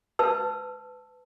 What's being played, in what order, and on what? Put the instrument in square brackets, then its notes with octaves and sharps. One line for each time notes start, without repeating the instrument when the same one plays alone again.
[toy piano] B4 A5 E6